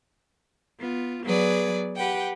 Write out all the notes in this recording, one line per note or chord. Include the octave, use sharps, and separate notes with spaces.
B3 F4
F#3 B3 G#4 B4 D5
G4 B4 F#5 G5